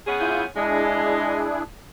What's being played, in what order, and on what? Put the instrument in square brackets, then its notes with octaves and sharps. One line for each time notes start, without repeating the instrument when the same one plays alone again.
[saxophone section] B3 C#4 G#4
[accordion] E4 F4 G6
[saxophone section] G#3 [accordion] D4 E4 G#4